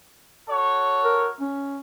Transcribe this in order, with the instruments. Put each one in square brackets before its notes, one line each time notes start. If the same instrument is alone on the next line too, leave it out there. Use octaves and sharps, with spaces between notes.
[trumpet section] F#4 A4 C#5
[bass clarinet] A#4
C#4